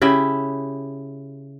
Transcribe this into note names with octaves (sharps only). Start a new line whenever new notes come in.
C#3 E4 G4